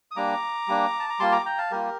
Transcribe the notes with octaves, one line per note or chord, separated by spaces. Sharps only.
D#6
G3 A#3 D4 A#5 D6
G3 A#3 D4
A5
A#5
G3 A#3 F4 A5 C6
A#5 D6
G5 A#5
F5 A5
G3 A#3 F4 G4 A#4